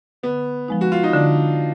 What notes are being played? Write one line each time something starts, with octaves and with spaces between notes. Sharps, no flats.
D3 B3
F3 G#3 D#4
F#4
F4
D#4
D3 D4